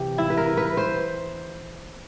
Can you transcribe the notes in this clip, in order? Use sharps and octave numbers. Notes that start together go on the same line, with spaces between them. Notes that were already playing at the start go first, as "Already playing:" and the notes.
Already playing: C3 E3 G4
E4
B4
A#4
B4
C5